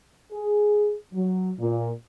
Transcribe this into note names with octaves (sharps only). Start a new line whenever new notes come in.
G#4
F#3
A#2